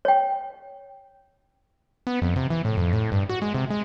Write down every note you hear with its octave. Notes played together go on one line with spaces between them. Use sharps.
C#5 G5
B3
F2
C3
E3
A2
F2
A2
G2
F#4
G#3
C3
G#3